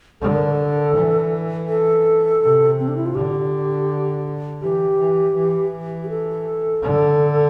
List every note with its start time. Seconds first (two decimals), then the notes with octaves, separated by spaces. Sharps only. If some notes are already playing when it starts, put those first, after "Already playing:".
0.21 D3 A4
0.35 A#4
0.48 A4
0.95 E3
1.68 A4
2.41 C3
2.79 C4
2.88 D4
2.97 E4
3.06 F4
3.15 D3 G4
4.62 E3 G4
4.98 E3
5.35 E3
6.04 G4
6.09 A4
6.82 D3